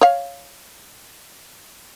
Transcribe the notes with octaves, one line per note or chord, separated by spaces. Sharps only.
C#5 F5